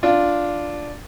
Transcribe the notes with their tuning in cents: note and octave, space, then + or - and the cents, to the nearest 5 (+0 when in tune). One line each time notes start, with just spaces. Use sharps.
D4 +0 F4 +0